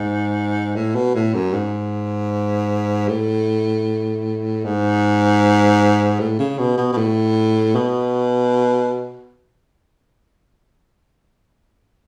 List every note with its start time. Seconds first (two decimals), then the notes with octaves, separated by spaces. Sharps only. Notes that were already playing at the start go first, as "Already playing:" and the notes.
Already playing: G#2
0.76 A2
0.95 B2
1.15 A2
1.34 F#2
1.54 G#2
3.09 A2
4.65 G#2
6.20 A2
6.39 C#3
6.59 B2
6.78 B2
6.93 B2
6.97 A2
7.75 B2